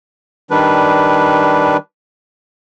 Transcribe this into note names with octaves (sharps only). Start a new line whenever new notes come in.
D#3 G3 D4 B4